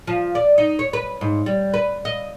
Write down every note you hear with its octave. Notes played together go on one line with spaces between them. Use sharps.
F3
D5
D#4
C#5
B4
G#2
G3
B4
D#5